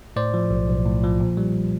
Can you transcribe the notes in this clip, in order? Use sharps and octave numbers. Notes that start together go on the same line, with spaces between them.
A2 C5 D5
F3
B1
B1
A2
F3
A#2
G3